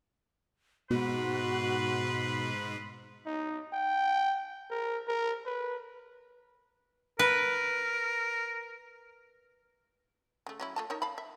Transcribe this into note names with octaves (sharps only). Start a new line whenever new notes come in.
G#2 B2 F#4 B4 B5 C6
D#4
G5
A#4
A#4
B4
A#4 B4
C#3 A3
F#3 C#4 E4
A3 F4 A5
D#4 A#4 C#5
F5 A5 B5
E5